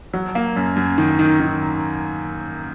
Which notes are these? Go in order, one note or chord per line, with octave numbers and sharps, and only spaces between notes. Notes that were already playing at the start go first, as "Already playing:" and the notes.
F#3
A#3
F#2
F#2
D#3
D#3
D#3